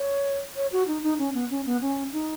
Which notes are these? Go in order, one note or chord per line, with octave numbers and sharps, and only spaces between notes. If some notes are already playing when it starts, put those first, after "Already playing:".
Already playing: C#5
C#5
F#4
D#4
D#4
C#4
B3
C#4
B3
C#4
D#4